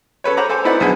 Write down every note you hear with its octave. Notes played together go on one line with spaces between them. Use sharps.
C#4 A4 B4 C#5
C5 C#5 F#5 A#5 B5 D6
A4 C5 G#5 D6
C4 D#4 E4 B4 D5 F#5
B1 D3 G#4 B4